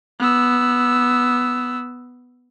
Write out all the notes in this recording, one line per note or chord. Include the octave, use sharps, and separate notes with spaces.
B3 E6